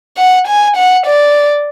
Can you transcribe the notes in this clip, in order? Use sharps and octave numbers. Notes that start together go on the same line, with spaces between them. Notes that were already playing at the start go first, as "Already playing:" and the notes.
F#5
G#5
F#5
D5